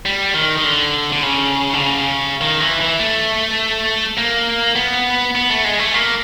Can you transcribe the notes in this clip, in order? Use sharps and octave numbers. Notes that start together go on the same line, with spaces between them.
G3
D#3
D#3
D3
D3
C#3
D3
C#3
D#3
E3
E3
A3
A#3
B3
B3
A3
G#3
A3
A#3